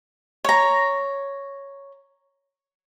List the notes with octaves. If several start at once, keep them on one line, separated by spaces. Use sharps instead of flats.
C#5 A#5